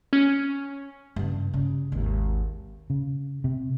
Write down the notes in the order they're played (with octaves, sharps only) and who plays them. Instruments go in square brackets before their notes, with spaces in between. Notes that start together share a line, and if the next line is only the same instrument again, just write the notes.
[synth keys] C#4
[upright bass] G2 C#3
C#3
G#1 D#2
[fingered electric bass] C#3
C3